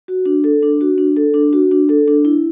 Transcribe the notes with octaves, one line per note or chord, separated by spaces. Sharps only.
F#4
D4
A4
D4
F#4
D4
A4
D4
F#4
D4
A4
D4
E4